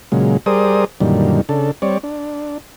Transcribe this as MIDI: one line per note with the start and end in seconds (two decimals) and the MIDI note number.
0.12 0.37 46
0.12 0.37 49
0.12 0.37 54
0.12 0.37 56
0.46 0.85 55
0.46 0.85 68
0.46 0.85 70
0.46 0.85 72
0.46 0.85 74
0.46 0.85 87
1.01 1.41 42
1.01 1.41 46
1.01 1.41 50
1.01 1.41 51
1.01 1.41 55
1.49 1.71 49
1.49 1.71 62
1.49 1.71 69
1.82 1.98 55
1.82 1.98 60
1.82 1.98 73
1.82 1.98 74
2.03 2.58 62